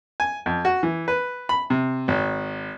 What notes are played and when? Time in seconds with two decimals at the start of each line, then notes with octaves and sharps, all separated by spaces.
0.20 G#5
0.46 F2
0.65 F#4
0.83 E3
1.08 B4
1.49 B5
1.70 C3
2.08 G#1